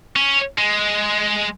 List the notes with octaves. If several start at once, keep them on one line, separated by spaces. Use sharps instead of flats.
C#4
G#3